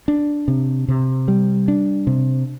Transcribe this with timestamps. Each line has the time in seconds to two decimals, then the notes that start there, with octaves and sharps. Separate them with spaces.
0.08 D4
0.48 C3
0.88 C3
1.28 G3
1.68 D4
2.07 C3